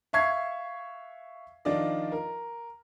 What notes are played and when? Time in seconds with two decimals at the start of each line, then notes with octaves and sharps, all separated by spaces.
0.13 E5 F5 C#6 G#6 C7
1.65 D#3 F3 D4 F4 D5 D#5
2.12 A#4